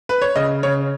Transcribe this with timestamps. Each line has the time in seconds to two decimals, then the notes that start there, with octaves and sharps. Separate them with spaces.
0.09 B4
0.22 C#5
0.36 C#3 D#5
0.63 C#3 C#5